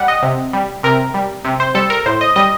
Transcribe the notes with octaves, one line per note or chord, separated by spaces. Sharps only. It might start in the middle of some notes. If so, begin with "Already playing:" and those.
Already playing: G3 F#5
D#5
C3
G3
C3 A#4
G3
C3
C5
G3 A4
A#4
A2 C5
D#5
G3 D#5